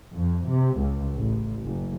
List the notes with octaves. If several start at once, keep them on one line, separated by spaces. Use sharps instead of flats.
F2
C3
C#2
A1
F#1